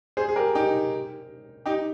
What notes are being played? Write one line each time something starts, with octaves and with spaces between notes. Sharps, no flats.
G#4 C5
G#4
G4 A#4
D#4 G4
D#4 G4